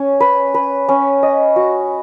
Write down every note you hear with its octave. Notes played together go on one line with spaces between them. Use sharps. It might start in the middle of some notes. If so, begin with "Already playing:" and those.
Already playing: C#4
B4
B4
C#4
D#5
F#4